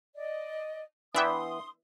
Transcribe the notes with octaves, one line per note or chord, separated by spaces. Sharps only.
D5 D#5
E3 B3 D4 E5 G5 C6 D#6